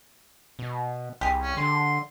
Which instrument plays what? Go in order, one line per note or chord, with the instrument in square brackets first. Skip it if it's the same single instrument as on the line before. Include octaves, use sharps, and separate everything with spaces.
[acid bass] B2
[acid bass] C2 [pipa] G4 G#4
[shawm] C#4
[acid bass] D3 [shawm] C6